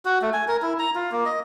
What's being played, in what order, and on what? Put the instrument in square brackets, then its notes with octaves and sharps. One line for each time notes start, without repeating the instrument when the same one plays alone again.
[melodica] F#4
A3
G#5
A#4
E4
A#5
F4
A#3
D#5